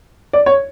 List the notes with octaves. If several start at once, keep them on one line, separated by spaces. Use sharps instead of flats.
D5
C#5